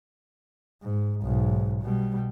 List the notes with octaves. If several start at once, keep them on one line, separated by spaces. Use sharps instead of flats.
G#2
B1 G#2
B2 G3